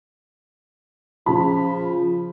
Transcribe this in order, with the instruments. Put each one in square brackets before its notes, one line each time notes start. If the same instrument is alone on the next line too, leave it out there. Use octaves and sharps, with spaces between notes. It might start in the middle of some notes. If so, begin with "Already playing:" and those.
[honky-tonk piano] C#3 B5 [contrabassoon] F3